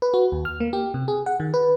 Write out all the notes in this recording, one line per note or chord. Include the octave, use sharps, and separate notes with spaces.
B4
F#4
D#2
F6
A#3
G4
C3
G#4
F#5
D#3
B4